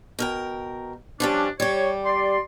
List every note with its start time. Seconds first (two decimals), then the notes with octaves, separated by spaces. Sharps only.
0.19 B2 A#4 G5
1.20 F3 G3 C#4 D4
1.60 G3 G4 C#5
2.05 D5 C6